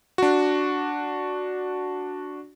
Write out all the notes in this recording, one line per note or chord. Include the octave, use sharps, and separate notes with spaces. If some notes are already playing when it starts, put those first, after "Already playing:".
D4 F#4